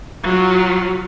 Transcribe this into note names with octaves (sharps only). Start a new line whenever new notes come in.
F#3 F4